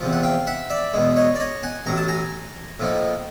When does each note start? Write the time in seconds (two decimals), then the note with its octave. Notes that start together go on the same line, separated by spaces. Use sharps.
0.01 E2 C3 F3
0.13 F#5
0.23 F5 G5
0.47 E5 F#5
0.70 D5 E5
0.93 E2 B2 G#3
1.16 C#5 D#5
1.35 D5
1.40 C#5 D#5
1.63 F#5 G#5
1.86 A1 A2 F#3 A#5
1.97 A5
2.08 G#5 A#5
2.80 A2 F3 A#3 D#4